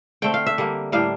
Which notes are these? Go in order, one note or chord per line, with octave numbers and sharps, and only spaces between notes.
D3 A3 C4 G5
F5
E5
D3 G3 A#3
A2 G3 A#3 D4 F5